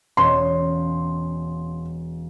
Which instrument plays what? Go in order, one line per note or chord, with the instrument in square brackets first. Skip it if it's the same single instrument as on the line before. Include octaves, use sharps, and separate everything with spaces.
[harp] E1 C#4 [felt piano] C6